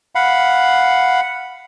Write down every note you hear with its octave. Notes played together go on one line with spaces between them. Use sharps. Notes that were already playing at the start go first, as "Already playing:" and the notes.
F5 F#5 B5